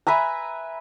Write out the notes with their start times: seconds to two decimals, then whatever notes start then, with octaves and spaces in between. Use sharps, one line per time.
0.07 B4 E5 G#5 A#5